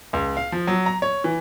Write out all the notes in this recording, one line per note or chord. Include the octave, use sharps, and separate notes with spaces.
C#2
F5
F3
F#3
A#5
C#5
E3